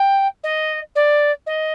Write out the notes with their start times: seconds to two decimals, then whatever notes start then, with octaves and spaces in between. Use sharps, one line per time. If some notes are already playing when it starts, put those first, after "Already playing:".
Already playing: G5
0.43 D#5
0.95 D5
1.46 D#5